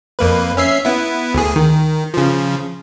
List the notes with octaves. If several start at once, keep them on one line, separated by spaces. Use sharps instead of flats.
F2 A#3 B4
C#4 E5 C7
B3 E4
D2 G#4
D#3
C#3 F3